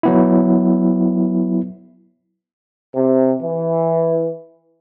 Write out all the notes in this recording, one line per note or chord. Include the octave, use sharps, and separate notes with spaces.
F#3 B3 E4
C3
E3